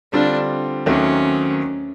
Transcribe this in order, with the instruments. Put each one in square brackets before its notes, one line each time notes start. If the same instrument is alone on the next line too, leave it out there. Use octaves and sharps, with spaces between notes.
[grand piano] D3 G3 C4 F4 [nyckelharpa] D4
[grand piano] D#2 D#3 F#3 A3 C4 [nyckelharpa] C#4